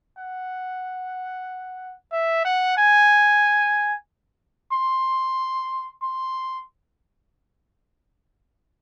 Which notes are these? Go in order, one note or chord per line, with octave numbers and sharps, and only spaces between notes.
F#5
E5
F#5
G#5
C6
C6